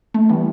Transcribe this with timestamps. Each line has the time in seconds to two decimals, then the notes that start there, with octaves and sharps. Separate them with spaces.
0.14 A3
0.29 E3 G3 B3